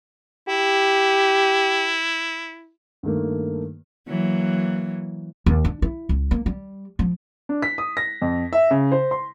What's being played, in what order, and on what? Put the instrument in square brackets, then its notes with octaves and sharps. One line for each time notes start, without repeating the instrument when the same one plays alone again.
[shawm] E4 [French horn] G4
[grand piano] G2 D#3 A3 A#3
[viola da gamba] E3 F#3 A#3
[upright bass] D#2
D4
E4
C#2
A#3
G3
F3
[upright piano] D4
B6
D#6
A#6
F2
E5
C#3
C5
C6